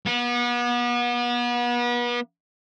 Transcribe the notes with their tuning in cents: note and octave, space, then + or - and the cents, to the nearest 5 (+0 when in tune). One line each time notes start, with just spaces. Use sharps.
B3 -35